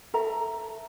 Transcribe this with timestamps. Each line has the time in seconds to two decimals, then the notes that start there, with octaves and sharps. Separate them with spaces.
0.14 A4 E5 A#5